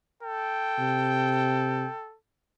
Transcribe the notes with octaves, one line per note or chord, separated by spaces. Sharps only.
A4 G5
C3